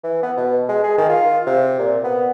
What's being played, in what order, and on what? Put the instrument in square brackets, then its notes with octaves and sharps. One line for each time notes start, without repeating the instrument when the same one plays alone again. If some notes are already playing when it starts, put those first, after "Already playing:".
[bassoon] E3
B3
B2
G#3
G#4
D#3
F4
C3
A#2
B3